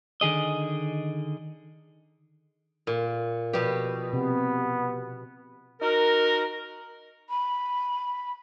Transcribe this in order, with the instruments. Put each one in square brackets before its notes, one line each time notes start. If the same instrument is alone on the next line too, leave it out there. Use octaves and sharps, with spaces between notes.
[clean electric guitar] D3 D#3 G#4 D#5
[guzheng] A#2
[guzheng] B2 G4 [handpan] F3 B4 D5
[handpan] C3 [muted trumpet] B3
[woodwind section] D#4 F#4 A#4
[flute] B5